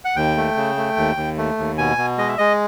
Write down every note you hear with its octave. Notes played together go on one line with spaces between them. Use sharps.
F#5
D#2 G5
A3
C#3
A3
D#2
D#2
A3
D#2
B2 G#5
B2
G#3 D#5
E5
G#3 D#5